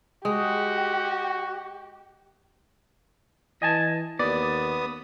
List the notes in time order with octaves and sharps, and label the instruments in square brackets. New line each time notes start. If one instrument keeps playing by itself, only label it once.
[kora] G#3 [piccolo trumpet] F#4 [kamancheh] G4
[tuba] E3 [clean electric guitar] D#5 G#5 A5
[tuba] D#2 [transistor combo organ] B3 D#6 [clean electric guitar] D5